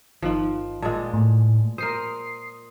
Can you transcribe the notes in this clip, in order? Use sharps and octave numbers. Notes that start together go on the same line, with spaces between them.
G1 D#3 F3 D#4
A#2 G#3 A5
A2
A#4 C5 D#6 C7